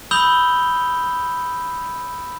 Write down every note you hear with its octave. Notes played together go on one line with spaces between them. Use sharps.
B5 D#6 E6 G6 F7 G7